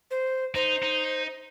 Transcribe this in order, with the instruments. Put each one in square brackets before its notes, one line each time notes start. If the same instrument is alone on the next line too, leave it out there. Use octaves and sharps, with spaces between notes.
[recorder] C5
[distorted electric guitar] D#4 [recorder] C5
[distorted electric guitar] D#4